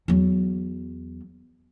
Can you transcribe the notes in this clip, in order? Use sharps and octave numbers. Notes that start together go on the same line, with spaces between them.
E2 F#3